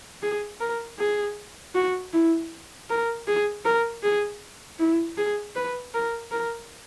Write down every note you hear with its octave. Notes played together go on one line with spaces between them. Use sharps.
G#4
A#4
G#4
F#4
E4
A#4
G#4
A#4
G#4
E4
G#4
B4
A#4
A#4